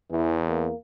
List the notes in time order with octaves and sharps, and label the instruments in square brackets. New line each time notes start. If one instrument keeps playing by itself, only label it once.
[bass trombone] E2 [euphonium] E3
[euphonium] A#3